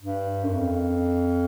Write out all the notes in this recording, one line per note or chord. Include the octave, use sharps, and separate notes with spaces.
G2
F#2
F2